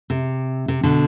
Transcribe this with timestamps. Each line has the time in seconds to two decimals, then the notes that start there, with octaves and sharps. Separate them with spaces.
0.10 C3
0.68 C3
0.83 B2 D3